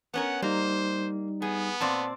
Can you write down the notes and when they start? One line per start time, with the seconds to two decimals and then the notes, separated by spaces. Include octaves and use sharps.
0.14 B3 C#4 A#4 F#5
0.42 G3 A#3 D#4 C5
1.42 B3 G#4
1.81 A#2 C4 D5 A5